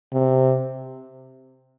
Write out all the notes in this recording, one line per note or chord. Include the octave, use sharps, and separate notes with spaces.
C3